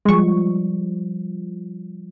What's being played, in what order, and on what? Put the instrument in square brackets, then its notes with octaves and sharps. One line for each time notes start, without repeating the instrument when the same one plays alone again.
[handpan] F3 G3 [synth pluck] G#3 C#6